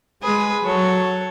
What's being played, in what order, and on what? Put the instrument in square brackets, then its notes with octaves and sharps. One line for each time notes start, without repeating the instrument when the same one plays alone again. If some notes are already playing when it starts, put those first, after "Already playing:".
[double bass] G#3 [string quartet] G#4 B4
[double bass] F#3 [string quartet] A4 C#5